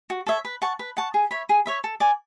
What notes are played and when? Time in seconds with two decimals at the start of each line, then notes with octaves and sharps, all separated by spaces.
0.10 F#4
0.27 A4 C#5 E5
0.45 B4
0.62 F#5 A5 C#6
0.79 B4
0.97 F#5 A5 C#6
1.14 G#4
1.31 C#5 E5 B5
1.49 G#4
1.66 C#5 E5 B5
1.84 A4
2.00 D5 G#5 D6